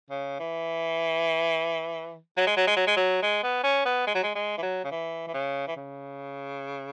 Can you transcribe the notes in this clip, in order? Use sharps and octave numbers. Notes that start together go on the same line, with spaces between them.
C#3
E3
F#3
G#3
F#3
G#3
F#3
G#3
F#3
G#3
B3
C#4
B3
G#3
F#3
G#3
G#3
E3
F#3
C#3
E3
E3
C#3
E3
C#3